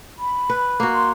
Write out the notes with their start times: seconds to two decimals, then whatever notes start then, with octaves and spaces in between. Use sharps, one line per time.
0.19 B5
0.50 B4
0.80 A#3 F#4
0.94 C6